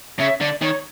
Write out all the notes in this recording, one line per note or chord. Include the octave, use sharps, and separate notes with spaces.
C#3 E5
D3 D5
D#3 C#5